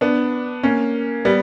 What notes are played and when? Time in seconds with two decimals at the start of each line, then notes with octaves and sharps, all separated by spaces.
0.01 B3 D4
0.63 A#3 C#4
1.25 G3 B3